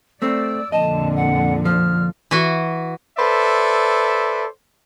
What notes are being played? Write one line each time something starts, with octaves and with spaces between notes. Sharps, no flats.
A3 C4 D5 E6
F2 A#2 D3 D#5 A5
F#5
F3 F6
E3 F#4
A4 B4 C5 D5 E5